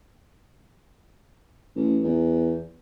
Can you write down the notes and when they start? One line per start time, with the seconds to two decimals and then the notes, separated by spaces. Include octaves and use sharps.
1.75 A1
2.03 E2